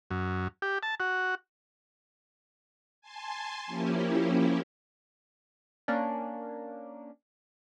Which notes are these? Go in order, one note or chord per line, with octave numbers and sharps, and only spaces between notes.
F#2
G4
A5
F#4
G#5 A5 C6
F3 A#3 C#4 E4 G4
A#3 C#4 D4